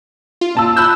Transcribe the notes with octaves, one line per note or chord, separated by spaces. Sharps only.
F4
A#2 A5 E6
B5 E6 F#6 G6